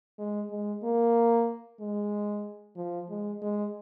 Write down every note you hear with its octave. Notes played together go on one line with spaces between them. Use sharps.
G#3
G#3
A#3
G#3
F3
G#3
G#3